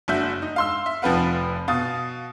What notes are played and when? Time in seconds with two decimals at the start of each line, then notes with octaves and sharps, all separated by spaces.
0.08 F#1 D4 F#4 E5 G6
0.42 D#4
0.56 F5 C6 E6
0.86 E5
1.02 F1 F3 C4 B4 F5 F#5
1.68 B2 F5 D#6 A6